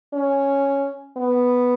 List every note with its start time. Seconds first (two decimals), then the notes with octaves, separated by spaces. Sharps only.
0.13 C#4
1.17 B3